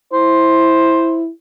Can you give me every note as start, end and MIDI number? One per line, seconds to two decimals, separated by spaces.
0.13 1.30 64
0.13 1.21 72